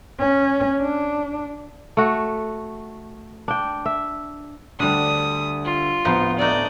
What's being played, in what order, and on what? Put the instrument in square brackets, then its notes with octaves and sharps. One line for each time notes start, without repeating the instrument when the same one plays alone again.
[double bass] C#4
D4
[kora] A3 F#4
D4 G5
E5
[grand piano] D2 D3 [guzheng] G3 D4 [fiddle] D#6
[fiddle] F4
[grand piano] D1 B3 [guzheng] F3 D#4 B4
[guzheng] A3 D4 D#4 [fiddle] D5 D#5